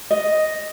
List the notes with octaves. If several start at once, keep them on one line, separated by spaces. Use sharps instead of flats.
D#5